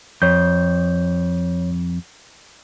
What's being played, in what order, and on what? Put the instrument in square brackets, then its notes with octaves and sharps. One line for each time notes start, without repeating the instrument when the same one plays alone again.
[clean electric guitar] F2 [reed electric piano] C#5 G6